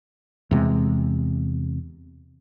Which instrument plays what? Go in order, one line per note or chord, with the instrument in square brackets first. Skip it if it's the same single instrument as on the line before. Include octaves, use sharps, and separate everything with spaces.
[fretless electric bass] E2 C3 G#3